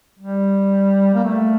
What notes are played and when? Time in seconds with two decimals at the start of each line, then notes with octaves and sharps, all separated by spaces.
0.19 G3
1.14 A#3
1.24 A3